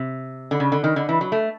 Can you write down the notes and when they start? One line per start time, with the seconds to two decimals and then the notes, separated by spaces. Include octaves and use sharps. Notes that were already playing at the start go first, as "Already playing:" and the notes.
Already playing: C3
0.51 D3
0.60 C#3
0.72 D3
0.84 D#3
0.96 D3
1.09 E3
1.21 F#3
1.32 A3